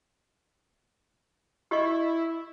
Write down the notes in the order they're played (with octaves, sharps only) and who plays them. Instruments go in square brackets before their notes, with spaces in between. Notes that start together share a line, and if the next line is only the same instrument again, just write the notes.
[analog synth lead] E4 [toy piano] G4 D#5 C#6